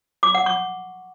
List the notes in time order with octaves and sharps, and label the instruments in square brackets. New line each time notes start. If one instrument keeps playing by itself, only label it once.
[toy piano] D6
F#5
C#6